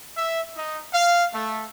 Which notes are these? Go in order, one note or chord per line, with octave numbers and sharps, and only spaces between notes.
E5
D#4
F5
A3